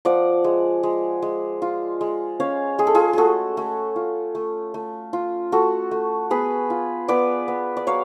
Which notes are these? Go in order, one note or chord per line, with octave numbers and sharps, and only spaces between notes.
F3 D5 F#5
G#3
G#3
G#3
F4
G#3
C#4 C#5 F5
G#3 G#4
A4
F4 G#4
A3 F#4 G#4 A4
A3
F4
A3
A3
F4
A3 F#4 A4
A3
B3 G#4 B4
F4
B3 B4 D5
B3
D5
F#3 C#5 F5